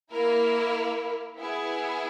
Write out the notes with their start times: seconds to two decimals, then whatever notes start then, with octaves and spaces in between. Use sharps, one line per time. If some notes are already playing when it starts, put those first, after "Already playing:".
0.11 A#3 E4 A#4
1.36 B3 E4 G#4